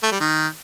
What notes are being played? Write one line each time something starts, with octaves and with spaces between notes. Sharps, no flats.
A3
G3
D#3